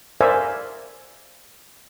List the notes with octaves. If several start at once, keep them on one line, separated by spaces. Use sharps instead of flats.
A#4 C5 D5 E5 F5 G#5